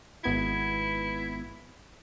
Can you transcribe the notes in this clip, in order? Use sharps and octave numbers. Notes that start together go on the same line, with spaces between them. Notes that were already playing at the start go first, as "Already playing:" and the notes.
G#1 B3 E4 G#6